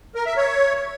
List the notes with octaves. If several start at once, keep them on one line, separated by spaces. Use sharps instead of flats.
A#4
E5
C#5